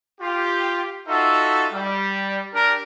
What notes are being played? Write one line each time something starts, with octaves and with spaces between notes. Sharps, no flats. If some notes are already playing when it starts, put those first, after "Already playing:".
F4 G4
D#4 F4 F#4 A4 E5
G3
D4 G4 A#4